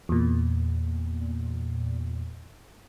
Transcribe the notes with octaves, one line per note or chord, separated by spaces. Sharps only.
E2 A#2